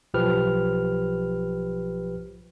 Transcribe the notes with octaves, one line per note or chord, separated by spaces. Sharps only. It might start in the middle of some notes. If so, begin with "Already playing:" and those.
B1 F3 G4 B4 F6